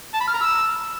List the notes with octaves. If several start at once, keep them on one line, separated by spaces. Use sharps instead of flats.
A5
B5
F6
A#5
E6